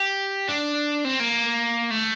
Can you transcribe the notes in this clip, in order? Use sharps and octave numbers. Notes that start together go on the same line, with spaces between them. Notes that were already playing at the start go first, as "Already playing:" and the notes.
Already playing: G4
D4
C4
A#3
A3